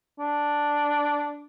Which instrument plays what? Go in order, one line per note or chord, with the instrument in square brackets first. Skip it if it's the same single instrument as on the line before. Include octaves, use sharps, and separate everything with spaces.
[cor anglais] D4